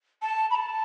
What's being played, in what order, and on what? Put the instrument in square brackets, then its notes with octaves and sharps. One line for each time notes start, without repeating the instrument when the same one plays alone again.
[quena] A5
B5
A5